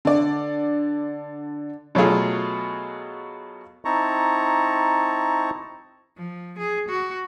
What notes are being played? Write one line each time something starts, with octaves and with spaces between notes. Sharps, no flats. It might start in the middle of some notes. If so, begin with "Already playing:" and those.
D3 D5
B2 F#3 A3 F4 G#4
C4 D#4 E4 A5 A#5 C#6
F3
G#4
F#4